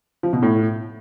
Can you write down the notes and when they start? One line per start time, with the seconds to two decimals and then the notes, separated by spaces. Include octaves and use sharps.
0.23 F3
0.33 B2
0.42 A2